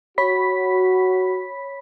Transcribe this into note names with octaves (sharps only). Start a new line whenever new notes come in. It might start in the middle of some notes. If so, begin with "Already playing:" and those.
F#4 C#5 B5 B6